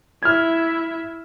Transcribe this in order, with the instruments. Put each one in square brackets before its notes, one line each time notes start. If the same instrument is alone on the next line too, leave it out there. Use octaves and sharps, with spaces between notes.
[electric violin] E4 E5 [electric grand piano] F6 G#6